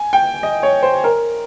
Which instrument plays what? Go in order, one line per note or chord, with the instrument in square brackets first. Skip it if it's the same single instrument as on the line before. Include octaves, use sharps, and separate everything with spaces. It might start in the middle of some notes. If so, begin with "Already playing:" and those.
Already playing: [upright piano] G#5
G5
D#5
C#5
C5
A#4